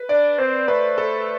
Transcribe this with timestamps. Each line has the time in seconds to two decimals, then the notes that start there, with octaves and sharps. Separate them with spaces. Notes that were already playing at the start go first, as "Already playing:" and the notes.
Already playing: B4
0.09 D4 D5
0.38 C4 C5
0.68 A3 B4
0.98 A4